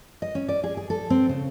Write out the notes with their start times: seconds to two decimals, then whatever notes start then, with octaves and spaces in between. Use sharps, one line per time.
0.22 D#5
0.35 C#4
0.49 D5
0.64 G#4
0.77 G#4
0.90 A4
1.10 C4
1.29 C#3